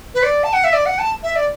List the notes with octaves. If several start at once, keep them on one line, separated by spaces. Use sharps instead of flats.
B4
D5
A5
F#5
E5
D5
F#5
A5
E5
D5